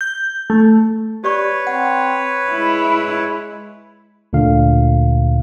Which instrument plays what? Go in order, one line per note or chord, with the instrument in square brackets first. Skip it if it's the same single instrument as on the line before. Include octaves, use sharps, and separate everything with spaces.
[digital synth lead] G6
A3
[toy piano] G4 D5 C#6 [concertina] B4 C#5
[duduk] C4 [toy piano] F#5
[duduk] G#3 [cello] E4
[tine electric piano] D2 A#2 D3 F5